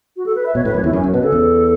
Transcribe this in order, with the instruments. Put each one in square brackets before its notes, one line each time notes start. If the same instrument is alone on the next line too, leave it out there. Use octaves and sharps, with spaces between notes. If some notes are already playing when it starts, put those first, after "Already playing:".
[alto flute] F#4
A4
B4
E5
[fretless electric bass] B2 [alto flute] C#5
[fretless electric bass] A2 [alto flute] B4
[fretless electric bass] F#2 [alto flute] C#5
[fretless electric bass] E2 [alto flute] E4
[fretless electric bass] F#2 [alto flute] C#4
[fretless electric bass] F#2
[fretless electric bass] B2 [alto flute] B4
[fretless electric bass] C#3 [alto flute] A4
[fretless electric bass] E2